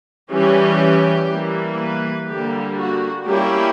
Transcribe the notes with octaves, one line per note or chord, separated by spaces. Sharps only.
E3 G3 C#4 G4
E3 G3 A#3
B4
D3 G3 A#3 G4
F#4
G3 A#3 C#4 E4 G4